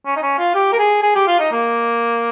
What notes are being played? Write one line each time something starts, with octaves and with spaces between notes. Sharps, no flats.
C#4
D#4
C#4
F4
G4
A#4
G#4
G#4
G4
F4
D#4
A#3